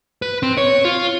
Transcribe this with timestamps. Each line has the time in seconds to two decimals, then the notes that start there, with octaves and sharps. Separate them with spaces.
0.22 B4
0.43 C4
0.57 C#5
0.85 F4